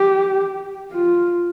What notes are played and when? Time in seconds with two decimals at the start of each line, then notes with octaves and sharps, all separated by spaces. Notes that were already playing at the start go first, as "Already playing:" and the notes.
Already playing: G4
0.92 F4